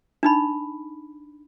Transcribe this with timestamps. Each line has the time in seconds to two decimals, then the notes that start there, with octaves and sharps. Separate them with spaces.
0.23 D4 D#4 B5